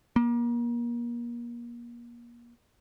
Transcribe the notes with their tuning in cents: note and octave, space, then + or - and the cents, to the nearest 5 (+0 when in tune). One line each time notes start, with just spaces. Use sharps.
A#3 +35